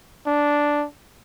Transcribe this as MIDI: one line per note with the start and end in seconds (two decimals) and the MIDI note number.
0.27 0.86 62